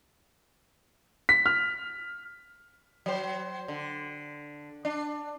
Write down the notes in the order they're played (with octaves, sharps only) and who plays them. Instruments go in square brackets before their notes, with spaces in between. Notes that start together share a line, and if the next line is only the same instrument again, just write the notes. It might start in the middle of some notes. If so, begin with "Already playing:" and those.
[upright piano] B6
F6
[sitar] F#3 C5
D3
D4